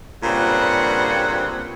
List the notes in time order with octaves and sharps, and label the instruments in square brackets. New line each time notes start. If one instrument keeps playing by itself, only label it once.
[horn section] G2 A#2 C#3 G3 C4 F#5